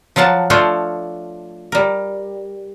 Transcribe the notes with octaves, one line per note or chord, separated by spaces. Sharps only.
F3 F#3 F5 F#5 A5
F3 A3 D4 F4 C5 C#5
G3 A#4